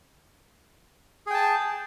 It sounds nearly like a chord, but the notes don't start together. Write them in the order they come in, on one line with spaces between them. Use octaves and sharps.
G#4 G5 A5